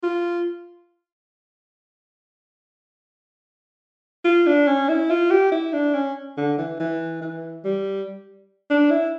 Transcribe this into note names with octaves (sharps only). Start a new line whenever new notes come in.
F4
F4
D4
C#4
E4
F4
G4
E4
D4
C#4
D3
E3
E3
E3
G3
D4
E4